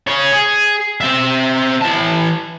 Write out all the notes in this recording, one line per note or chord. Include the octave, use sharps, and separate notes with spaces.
G#4 C#5
G#4
C4 E5
E3 A5